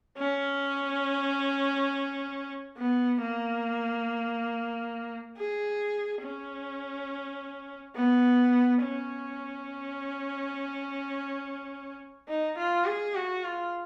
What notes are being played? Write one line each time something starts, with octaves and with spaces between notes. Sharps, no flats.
C#4
B3
A#3
G#4
C#4
B3
C#4
D#4
F4
G#4
F#4
F4